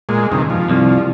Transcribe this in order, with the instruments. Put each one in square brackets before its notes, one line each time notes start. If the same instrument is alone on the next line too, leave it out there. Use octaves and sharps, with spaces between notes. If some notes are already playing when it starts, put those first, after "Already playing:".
[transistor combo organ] A#2 G#3
G2 C3 D#3
F3
[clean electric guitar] C2